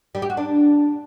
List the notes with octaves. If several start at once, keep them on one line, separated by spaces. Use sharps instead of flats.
G3
G4
F#4
D4